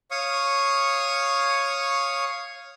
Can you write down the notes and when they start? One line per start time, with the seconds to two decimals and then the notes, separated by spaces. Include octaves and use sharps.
0.11 C#5 F5 C#6 D#6